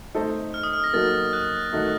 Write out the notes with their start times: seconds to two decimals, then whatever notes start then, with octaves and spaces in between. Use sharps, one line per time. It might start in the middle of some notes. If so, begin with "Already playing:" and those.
0.15 A3 D#4 A4 C5 D#5
0.54 F6
0.63 D#6
0.73 F6
0.84 A#6
0.93 F#3 A#3 D#4 F#4 A4 A6
1.33 F#6
1.73 D#3 A3 D#4 F#4